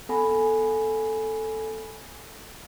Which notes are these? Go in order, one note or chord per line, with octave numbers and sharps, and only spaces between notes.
B3 A4 F#5 G#5 B5